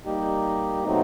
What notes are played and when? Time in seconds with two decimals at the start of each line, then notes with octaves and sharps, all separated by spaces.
0.05 G3 A#3 D#4 G4
0.84 B2 F#3 A3 C4 D#4